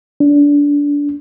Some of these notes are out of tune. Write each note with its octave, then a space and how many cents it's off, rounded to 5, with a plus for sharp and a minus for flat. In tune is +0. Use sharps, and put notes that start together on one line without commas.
D4 -25